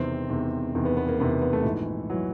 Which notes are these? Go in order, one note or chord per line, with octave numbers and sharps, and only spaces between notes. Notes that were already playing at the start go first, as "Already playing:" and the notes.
Already playing: E1 E2 C3 D#3 C4
E1 E2 C3 D#3
E1 E2 C3 D#3
B3
B3
A#3
E1 E2 C3 D#3 B3
B3
B3
A3
A#1 G#2 E3
E3 F#3